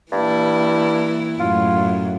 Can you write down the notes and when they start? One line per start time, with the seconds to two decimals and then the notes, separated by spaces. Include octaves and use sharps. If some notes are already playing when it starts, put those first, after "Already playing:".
0.12 G2 E3 A#3 E4
1.40 F#2 A2 F4